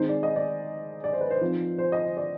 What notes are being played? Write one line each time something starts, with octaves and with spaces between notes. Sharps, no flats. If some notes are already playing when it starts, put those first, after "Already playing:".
Already playing: D#3 G#3 C4 D#4 C5
D5
D#5
D5
D5
C5
B4
C5
F3 C4 D#4
C5
D#5
C5
D5